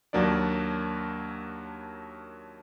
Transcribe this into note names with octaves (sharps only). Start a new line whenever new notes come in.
D#2 F#3 A#3 D4 D5